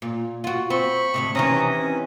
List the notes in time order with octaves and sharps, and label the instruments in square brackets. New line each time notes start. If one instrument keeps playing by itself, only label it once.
[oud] A#2
F4 F#4
[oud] C4 [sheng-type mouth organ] B5 C#6
[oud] D2 A2 C3
[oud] C3 D#3 E3 [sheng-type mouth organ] C#4 A#5 D#6
[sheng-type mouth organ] C#4